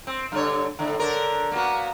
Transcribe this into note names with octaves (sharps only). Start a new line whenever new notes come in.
C4
G2 D3 C#5
A2 D3
D3 D4 A#4
A#3 B3 F#4